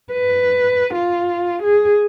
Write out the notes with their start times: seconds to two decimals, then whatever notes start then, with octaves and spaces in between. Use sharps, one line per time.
0.13 B4
0.95 F4
1.63 G#4